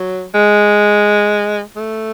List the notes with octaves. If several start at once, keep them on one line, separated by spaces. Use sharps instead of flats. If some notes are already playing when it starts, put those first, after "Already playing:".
Already playing: F#3
G#3
A3